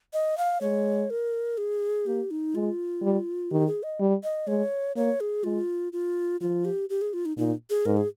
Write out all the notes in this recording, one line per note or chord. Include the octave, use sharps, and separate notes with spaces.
D#5
F5
G#3 C#5
A#4
G#4
A#3 G4
D#4
G#3 F4
G3
D#3 G4
G#4
D#5
G3
D#5
G#3 C#5
A#3 C#5
G#4
G#3 F4
F4
F3 F4
G4
G4
G#4
F4
D#4
A#2 D#4
G#4
G#2 A#4
G#4